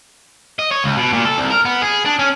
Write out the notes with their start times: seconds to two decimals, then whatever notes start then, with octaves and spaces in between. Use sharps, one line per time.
0.59 D#5
0.71 C#5
0.84 C#2
0.97 B2
1.13 A#2
1.25 A4
1.38 C2
1.51 A#4
1.65 B3
1.82 G#4
2.05 D4
2.19 C#4